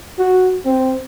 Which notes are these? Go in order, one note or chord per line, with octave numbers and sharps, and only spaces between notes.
F#4
C4